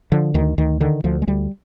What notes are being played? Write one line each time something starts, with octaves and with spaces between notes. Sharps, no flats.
D3 F3
D2 D#3
D2 D#3
D3 D#3
D2 F3
G#3
D2 G3